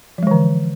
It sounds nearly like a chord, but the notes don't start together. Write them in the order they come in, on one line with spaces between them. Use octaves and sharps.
F3 G#3 E3 D3